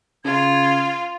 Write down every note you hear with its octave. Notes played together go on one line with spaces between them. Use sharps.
C#3 F4 G#6